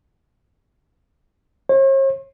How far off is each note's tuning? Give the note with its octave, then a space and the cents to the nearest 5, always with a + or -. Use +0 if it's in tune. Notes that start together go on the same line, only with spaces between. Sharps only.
C#5 -45